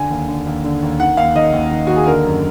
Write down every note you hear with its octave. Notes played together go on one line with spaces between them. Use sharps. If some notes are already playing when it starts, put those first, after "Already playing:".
Already playing: D3 G#5
D#2
D3
D#2
D3
D#2
D#3 F#5
D#2 F5
D#3 D#5
D#2
D#3
D#2 F#4
G#4
D3 A#4
F#2